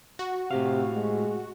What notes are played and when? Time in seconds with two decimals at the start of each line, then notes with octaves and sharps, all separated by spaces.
0.19 F#4
0.51 A2 C3 G4 F5
0.94 G#3